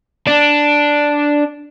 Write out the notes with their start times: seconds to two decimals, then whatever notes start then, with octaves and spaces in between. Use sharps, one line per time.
0.27 D4